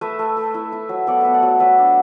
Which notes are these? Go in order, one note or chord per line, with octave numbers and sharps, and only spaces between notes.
A3 B4 E5
A3
A3
E4
E4
F#3
B3 A4 D5
B3 B4 E5
D5 F#5
F#3
F#3 B4 E5
D4